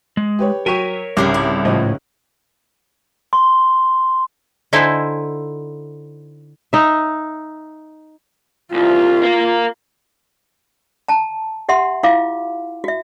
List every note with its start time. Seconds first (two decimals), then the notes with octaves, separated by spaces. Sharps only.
0.17 G#3
0.39 G4 B4 C#5
0.66 F#3 A#4 C#5 G5 C#6 B6 D#7
1.17 C2 G#2 C#3 G4 G#4 D6
1.34 E4
1.65 C#2 A2 F3 D#5
3.33 C6
4.73 D3 D#4 E4 A4 C5 G#5
6.73 D#4 E5
8.74 C2 F4
9.22 A#4 F5
11.08 A5 A#5
11.69 G4 E5 F#5 C6
12.03 E4 F4 F5 D6
12.84 F#4 E5